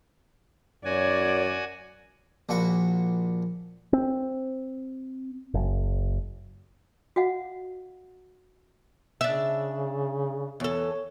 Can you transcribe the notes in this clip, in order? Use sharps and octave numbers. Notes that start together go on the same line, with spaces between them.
F#2 F#4 C#5 D5 G#5
A#1 A#2 F#4 B5 C#6
C4
F#1
F#4 D#5 F5 F#5
C#3 D4 E5
E2 A4 C#5